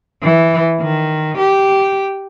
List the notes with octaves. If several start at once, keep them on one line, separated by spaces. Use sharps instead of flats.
E3
D#3
G4